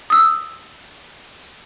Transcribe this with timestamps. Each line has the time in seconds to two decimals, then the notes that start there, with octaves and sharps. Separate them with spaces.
0.10 D#6 E6